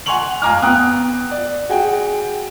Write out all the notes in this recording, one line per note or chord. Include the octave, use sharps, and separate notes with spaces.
F#5 G#5 C6 C#6 F7 F#7
F5 G#5 A#5 D6 F6
B3 G5 D#6 F#6
D5
F#4 G#4 G5